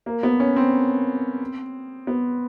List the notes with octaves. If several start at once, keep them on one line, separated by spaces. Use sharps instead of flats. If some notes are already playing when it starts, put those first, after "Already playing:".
A#3
B3
C#4
C4
B3